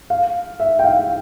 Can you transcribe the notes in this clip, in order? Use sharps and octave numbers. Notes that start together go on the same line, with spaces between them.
F5
E5
G5
F5